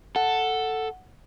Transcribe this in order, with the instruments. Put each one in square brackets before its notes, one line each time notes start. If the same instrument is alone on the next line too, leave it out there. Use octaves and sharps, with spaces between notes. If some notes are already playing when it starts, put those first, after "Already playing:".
[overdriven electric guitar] A4 [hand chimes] F#5